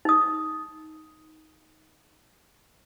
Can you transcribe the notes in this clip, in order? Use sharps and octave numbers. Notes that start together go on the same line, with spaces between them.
D#4 D#6